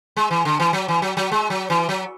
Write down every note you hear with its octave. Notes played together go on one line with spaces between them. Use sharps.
G#3
E3
D3
E3
F#3
E3
F#3
F#3
G#3
F#3
E3
F#3